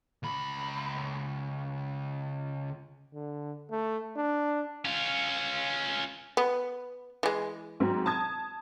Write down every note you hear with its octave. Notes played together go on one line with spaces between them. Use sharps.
C#2 B5
D3
A3
D4
C#4 F4
B3
E3 G#3
G#2 F#3 C4
A5 D#6 G#6